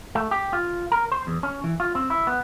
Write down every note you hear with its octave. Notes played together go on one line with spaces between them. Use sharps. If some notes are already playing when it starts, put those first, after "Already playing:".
A3
G4
F4
A#4
C5
E2
C#4
E3
F4
C4
E4
B3